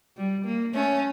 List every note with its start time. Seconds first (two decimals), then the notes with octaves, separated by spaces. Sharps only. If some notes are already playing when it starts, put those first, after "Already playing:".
0.17 G3
0.45 A#3
0.74 A3 C#4